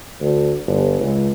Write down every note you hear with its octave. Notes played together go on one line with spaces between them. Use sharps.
D2
G1
C#2